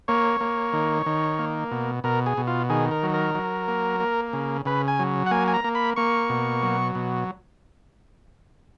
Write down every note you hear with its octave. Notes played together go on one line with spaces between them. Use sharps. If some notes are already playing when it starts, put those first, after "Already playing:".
A#3 C#5
A#3
D#3
D#3
A#3
B2
B2 A#4
G#4
B2
F4
D#3 G#4
A#4
F#3
A#4
F#3
A#3
A#3
C#3
C#3 B4
G#5
F#3
F#5
A#3 G#5
G#5
A#5
A#3
B5
A#3 C#6
B2
F#3
B2